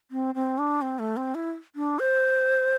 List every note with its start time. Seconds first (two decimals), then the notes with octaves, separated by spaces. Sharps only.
0.11 C4
0.35 C4
0.58 D4
0.82 C4
0.99 A3
1.17 C4
1.35 E4
1.76 D4
1.99 C5